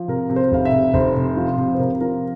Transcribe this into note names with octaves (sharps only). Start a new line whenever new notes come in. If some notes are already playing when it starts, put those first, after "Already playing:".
Already playing: F3
C3 A#4
C3
C5
F1 F5
E5
C3
F1 C5
C3
F3
C3
C5
C3 A#4
F3 A#4